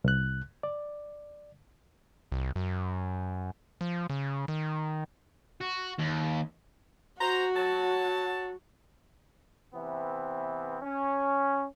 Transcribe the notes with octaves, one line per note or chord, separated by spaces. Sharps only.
C2 F#6
D5
C2
F#2
F3
C#3
D#3
F#4
D#2
F#4 C5 A#5
F#3 A5
C3 E3 B3 C4
C#4